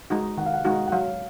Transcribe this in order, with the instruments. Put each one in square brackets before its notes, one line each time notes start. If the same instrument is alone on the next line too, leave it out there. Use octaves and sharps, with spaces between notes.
[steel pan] G#3 D#4 F#4
[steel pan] D#3 [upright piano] F#5
[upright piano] F5
F#5
[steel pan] G#3 D#4 F#4
[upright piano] F#5
[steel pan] F#3 [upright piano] F5